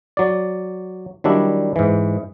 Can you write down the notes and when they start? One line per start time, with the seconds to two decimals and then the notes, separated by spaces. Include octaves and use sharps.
0.17 F#3 D5
1.24 D#3 F#3 G3 D4 E4
1.76 G#2 E3